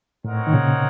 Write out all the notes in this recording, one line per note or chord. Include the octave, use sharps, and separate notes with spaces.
A2 C4 D#4 A#4 C#5 F#5
D#3
A#2 C#3